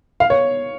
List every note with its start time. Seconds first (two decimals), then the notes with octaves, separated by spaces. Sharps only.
0.20 F5
0.30 C#5